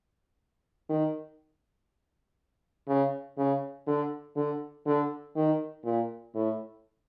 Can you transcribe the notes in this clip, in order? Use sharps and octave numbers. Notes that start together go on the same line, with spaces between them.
D#3
C#3
C#3
D3
D3
D3
D#3
A#2
A2